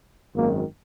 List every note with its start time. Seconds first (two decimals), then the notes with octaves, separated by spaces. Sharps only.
0.35 G#1 F#2 D#3 A#3